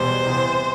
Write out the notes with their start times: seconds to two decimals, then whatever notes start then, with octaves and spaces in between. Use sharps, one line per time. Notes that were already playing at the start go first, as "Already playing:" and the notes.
Already playing: E2 B2 G3 C5
0.25 C3 E3 B3